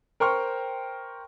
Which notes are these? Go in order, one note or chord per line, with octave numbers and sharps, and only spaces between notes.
A#4 C5 G5 C6 C#6 F6